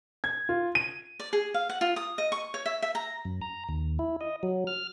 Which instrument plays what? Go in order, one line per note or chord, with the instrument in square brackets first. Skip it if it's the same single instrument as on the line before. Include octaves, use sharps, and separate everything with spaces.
[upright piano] G#6
F4
D#7
[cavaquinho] D5
G#4
F5
F#5
F4
D#6
D#5
C#6
C#5
E5
E5
A#5
[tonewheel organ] F#2
A#5
D#2
E4
D#5
F#3
F6